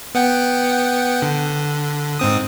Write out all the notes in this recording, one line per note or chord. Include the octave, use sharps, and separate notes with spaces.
B3 F#5 G5
D3
G#2 C4 D#6